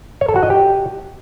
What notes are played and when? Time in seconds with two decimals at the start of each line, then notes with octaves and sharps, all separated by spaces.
0.21 C#5
0.29 A4
0.36 F#4
0.43 D#5
0.50 G4